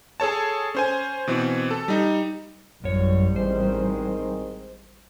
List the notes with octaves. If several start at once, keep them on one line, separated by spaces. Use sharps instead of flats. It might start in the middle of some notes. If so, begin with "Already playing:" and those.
G#4 A4 C#5 A5
C#4 C5 G#5
B2 E3 C4
A4
G3 D#4
A1 F#2 G3 C#5
D#3 G#3 C4 C5